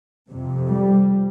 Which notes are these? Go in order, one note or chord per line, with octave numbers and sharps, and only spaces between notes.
F2 C3
G3